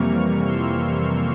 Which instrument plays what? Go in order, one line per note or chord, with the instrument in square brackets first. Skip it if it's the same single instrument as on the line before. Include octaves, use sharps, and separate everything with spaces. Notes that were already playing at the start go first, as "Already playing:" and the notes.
Already playing: [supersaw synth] F2 C3 E3 G3 A#3 C#6 F6
C6 E6